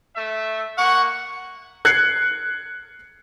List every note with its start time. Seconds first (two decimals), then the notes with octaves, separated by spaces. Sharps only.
0.15 A3 E5
0.77 A#3 F#5 C#6
1.85 F#6 G#6 C7 C#7